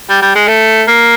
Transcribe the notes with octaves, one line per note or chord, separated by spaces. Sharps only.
G3
G3
G#3
A3
A#3